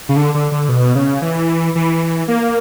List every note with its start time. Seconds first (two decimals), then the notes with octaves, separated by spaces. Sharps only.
0.09 C#3
0.16 D3
0.34 D3
0.52 D3
0.69 B2
0.95 C#3
1.22 E3
1.75 E3
2.28 A#3